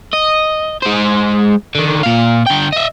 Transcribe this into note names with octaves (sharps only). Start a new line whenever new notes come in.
D#5
G#3 C5
D3 D#3
A#2 F5
D3 G5
D#5 E5